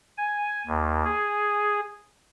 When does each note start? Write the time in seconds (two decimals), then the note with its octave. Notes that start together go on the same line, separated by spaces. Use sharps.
0.18 G#5
0.67 D#2
1.05 G#4